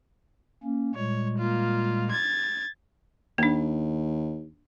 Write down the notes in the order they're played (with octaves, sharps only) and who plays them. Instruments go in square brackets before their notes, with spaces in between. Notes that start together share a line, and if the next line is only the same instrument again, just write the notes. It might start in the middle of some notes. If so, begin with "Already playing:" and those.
[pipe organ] A#3 C#4
[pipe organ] A#2 G3 G#3 [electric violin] C#5
[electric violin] A#3 F4
G#6 A6
[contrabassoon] D#2 [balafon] A#3 D4